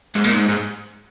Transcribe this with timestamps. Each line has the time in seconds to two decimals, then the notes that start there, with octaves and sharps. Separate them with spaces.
0.16 G#2
0.24 A#2
0.32 G#2
0.49 G#2